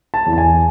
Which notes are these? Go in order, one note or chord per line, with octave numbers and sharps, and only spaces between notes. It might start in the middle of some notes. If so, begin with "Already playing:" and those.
A5
E2
A5
G#5